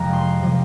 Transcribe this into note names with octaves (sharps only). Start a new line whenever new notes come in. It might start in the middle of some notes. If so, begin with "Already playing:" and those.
Already playing: F2 C3 F3 G#3 A#5
C6
C3 F3 G#3